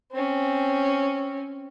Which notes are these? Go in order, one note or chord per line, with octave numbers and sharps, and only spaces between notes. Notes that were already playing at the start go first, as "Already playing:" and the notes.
C4 C#4